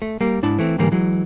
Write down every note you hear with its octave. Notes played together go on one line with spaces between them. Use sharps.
A3
G3 A#3
G#2 D4 E4 A5
E3 A3 C4
G#2 D3 E3 G3 A#3
E3 F#3 G#3